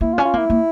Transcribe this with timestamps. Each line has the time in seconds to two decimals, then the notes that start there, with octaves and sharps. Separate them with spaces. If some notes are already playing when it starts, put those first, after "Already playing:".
0.01 A#3 E4
0.14 F4
0.18 C#4
0.25 F4
0.34 A#3 E4
0.50 A#3